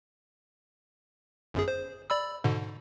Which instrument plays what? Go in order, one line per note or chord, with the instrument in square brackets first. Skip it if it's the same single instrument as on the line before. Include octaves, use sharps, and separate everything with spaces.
[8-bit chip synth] G1 F#2 G#4
C5
D5 B5 E6
G#2 B2 D3